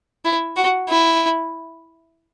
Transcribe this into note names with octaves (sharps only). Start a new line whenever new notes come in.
E4
F#4
E4